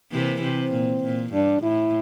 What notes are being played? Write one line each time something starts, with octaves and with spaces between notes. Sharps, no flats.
C3 E3 A#3
C3 C4
A#2
A#2
G2 D4
A2 E4